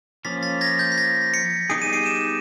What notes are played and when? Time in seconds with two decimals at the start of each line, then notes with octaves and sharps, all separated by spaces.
0.25 F3 A#3 C#4 A6 B6
0.43 A6 B6
0.61 G#6 A#6
0.79 G6 A6
0.92 B6
0.98 G#6 A#6
1.34 B6 C#7
1.70 G3 B3 D#4 G#4 D7
1.82 D#7
1.93 C7 D7
2.06 D7 E7